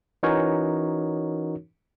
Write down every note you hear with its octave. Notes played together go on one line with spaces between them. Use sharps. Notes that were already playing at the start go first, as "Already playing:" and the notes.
E3 C#4 D#4 F#4 A#4 C#5